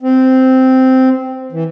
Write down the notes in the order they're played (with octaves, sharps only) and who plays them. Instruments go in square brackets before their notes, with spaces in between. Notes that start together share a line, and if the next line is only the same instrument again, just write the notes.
[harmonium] C4
E3